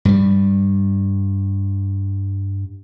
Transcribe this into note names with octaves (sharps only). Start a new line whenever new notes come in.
G2 G3